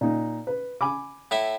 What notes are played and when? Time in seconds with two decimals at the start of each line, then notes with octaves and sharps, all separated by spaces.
0.01 A#2 D#4
0.47 B4
0.81 G#5 B5 D6
1.31 A2 E4 E5